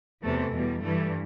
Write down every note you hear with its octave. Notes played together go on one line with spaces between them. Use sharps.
E2 C3 E3 A3
E2 B2 G3
G2 E3 G3 A3